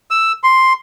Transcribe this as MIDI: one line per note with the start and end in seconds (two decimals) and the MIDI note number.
0.11 0.32 88
0.44 0.73 84